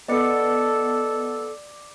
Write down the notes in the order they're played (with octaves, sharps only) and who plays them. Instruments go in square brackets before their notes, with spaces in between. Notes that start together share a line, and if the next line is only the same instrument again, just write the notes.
[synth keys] B3 [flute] A4 [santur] D5 [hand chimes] D#5 C#7